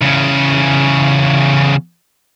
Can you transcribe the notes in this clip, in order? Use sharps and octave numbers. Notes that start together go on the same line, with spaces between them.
E2 C#3